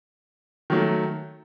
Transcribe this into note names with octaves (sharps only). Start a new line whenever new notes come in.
D#3 F#3 A3